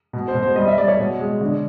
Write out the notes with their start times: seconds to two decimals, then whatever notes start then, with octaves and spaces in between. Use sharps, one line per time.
0.13 B2
0.28 C5
0.35 B2
0.43 C5
0.56 G3 D#5
0.68 E5
0.78 G3 D5
0.88 C#5
0.99 B2
1.20 G#3
1.41 D3